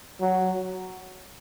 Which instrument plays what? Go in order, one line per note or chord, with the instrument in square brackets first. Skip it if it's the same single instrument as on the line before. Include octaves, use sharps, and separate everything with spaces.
[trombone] F#3